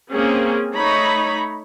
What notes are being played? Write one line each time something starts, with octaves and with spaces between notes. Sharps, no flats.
A#3 C4 C#4 G#4
A3 D#4 C#5 A#5 B5